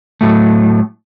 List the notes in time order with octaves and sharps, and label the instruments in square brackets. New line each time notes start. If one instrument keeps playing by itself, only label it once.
[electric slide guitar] A2 F#3 A3